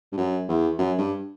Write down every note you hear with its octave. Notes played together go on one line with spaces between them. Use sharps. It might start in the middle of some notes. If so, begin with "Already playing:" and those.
G2
F#2
E2
F#2
G2